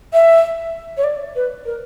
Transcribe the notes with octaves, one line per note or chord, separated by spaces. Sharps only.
E5
C#5
D5
B4
A#4